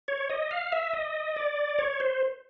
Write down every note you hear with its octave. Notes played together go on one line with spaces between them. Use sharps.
C#5
D#5
F5
E5
D#5
D5
C#5
C5